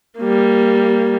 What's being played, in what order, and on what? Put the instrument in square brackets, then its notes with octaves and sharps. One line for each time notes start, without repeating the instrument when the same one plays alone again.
[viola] G3 A#3